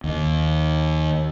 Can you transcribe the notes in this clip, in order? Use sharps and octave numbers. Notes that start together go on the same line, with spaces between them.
D#2